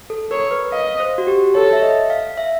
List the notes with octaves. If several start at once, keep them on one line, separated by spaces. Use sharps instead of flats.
A4
A#4 C#5
B4
D#5 F5
C5
F#4
G4
A4 C#5
E5
D#5
F5
E5